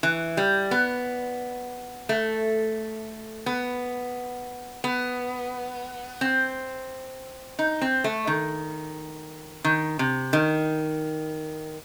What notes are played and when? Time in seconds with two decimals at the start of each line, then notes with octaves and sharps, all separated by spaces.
0.03 E3
0.37 G3
0.71 B3
2.09 A3
3.46 B3
4.84 B3
6.21 C4
7.59 D#4
7.81 C4
8.04 A3
8.27 D#3
9.64 D#3
9.99 C3
10.33 D#3